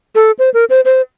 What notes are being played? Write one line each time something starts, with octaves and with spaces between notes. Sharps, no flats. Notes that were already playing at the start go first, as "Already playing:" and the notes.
A4
C5
A#4
C5
C5